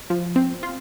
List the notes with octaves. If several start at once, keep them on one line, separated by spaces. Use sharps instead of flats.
F3
C4
F4